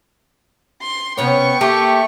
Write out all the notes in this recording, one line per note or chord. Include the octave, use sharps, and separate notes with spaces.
C6
C3 B3 C#4 C#5 G5 C#6
A3 A#3 G4